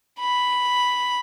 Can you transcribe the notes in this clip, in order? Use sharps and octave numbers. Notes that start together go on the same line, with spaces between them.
B5